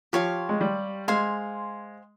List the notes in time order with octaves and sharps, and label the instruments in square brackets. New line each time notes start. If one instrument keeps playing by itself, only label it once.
[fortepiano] F3 [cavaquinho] G4 C#5 F5 C6
[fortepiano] G#3
G3
[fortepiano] G#3 [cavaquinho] C5 F5 G#5 C6